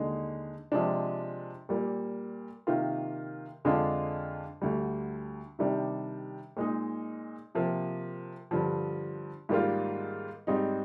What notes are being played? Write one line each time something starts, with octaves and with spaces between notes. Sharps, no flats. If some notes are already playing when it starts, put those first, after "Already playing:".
Already playing: D#2 D3 G#3 D#4
C3 F3 G#3 D4
A#2 G3 A#3
C3 D#3 A#3 F4
F2 D3 G#3 D4 F4
D2 D3 G3
C3 D#3 G3 D4
A#2 G#3 D#4
C3 F3 A#3
G2 D3 F3
G#2 D#3 G3 A#3 F4
G#2 G3 C4 D#4